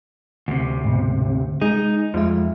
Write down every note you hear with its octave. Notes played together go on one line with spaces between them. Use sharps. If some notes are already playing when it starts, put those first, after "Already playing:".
D2 C3
G#2 B2
G#3 D#4 G#4
F2 F3 G#3 E5